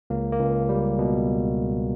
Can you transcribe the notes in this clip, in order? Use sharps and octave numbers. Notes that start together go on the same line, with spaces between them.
C#2 A#3
A#3
C#2
G3
B2